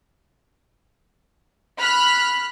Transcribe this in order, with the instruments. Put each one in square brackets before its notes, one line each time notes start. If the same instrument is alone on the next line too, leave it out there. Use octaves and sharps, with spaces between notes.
[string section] B5 F6 F#6 B6